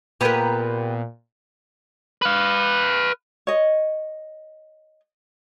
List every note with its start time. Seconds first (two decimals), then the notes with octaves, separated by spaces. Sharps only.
0.21 A#2 B3 G4 G#4 A#4 B4
2.22 B4 F5
3.47 C#5 D#5